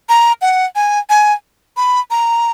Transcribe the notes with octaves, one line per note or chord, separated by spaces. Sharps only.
A#5
F#5
G#5
G#5
B5
A#5